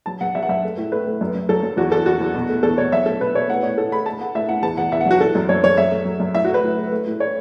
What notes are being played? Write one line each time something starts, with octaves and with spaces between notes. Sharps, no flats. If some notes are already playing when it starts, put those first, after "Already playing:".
F#3 A5
F#2 F#5
F#3 E5
F#5
F#2 E5
A3
A2
A3 B4
A3
F#2
F#2
F#3 A4
F#2
E2 F#4
E2 A4
E2 F#4
E2
B2
A3
E2 A4
B2 C#5
F#3 E5
A3 A4
B2 B4
B2 C#5
A2 F#5
A2 C#5
A2 A4
A3 B5
A3 A5
A3 F#5
A2 E5
A2 F#5
E2 A5
E2 F#5
E2 E5
F#5
F#3 F#4
E3 A4
F#2
F#2 C#5
F#2 C#5
F#2 E5
A3
F#3
F#2
A2 E5
F#4
A3
B4
A2
A3
A3
A2
A3 C#5